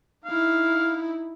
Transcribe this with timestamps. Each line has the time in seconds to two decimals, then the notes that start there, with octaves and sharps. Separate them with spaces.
0.25 D#4 E4 F5